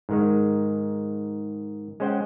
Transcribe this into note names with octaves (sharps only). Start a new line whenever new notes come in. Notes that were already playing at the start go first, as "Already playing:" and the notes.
G#2 D#3 G#3
G#3 C#4 C5 F#5 G5